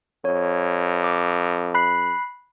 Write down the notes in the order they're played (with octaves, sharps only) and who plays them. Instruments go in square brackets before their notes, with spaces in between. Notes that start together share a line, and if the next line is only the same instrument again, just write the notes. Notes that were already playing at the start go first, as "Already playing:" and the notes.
[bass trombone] F2 [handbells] C#5
[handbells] D6
B5 F#6 C7